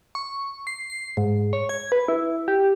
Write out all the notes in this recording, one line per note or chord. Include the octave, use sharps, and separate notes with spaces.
C#6
C7
C7
G#2
C#5
G#6
B4
E4
G4